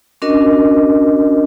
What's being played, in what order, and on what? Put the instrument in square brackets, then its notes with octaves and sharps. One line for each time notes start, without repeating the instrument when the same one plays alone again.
[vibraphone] C#4 D4 F#4 A#4 D#5